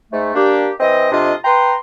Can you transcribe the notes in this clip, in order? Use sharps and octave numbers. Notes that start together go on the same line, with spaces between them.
G#2 A3
G3 A#3 D4 G4
E3 C4 D#5
F2 C3 D4 F4 D#5
B4 G5 A#5 C6